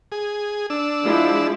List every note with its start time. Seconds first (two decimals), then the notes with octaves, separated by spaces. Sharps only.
0.12 G#4
0.70 D4 E6
1.06 F3 G#3 E4